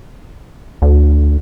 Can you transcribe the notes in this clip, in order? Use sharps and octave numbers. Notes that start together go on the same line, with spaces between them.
D2